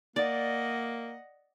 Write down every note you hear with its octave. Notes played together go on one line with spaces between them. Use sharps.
A#3 D5 D#5 F#5